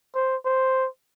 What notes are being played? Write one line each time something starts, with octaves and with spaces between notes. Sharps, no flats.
C5
C5